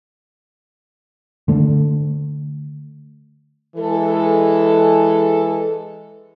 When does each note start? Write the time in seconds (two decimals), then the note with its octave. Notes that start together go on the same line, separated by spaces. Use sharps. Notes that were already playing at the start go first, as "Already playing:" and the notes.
1.48 D3 A3
3.77 E3 G#3 A4